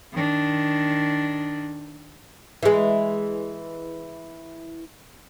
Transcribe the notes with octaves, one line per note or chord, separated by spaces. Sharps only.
D#3 D4
E3 G#3